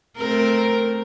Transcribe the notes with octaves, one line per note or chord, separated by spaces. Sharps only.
A3 C4 A#4